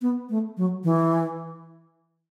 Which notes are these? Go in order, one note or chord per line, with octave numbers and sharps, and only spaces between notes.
B3
A3
F#3
E3